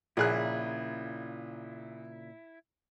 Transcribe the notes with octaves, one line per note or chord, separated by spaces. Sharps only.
A#1 A#2 C#3 E4 G#4 F#6